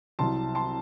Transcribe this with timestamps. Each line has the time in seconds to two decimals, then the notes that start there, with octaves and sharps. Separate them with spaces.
0.19 C2 C3 F#3 A5 C6
0.55 A5 C6